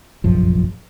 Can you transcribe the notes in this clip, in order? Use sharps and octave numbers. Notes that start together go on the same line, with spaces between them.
F1 A#1 F#2 F3